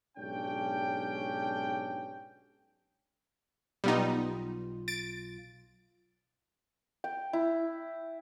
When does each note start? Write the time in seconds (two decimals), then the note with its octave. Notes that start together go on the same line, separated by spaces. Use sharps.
0.18 B1 G#2 C#4 D4 G4 G5
3.84 B1 G3 B3 D#4 F4
4.88 A6 D7
7.04 G5
7.33 E4